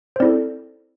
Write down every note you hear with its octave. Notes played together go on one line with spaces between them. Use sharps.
C5
C4 E4 A4 D5